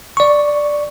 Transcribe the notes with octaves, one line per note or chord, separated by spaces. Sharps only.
D5 C#6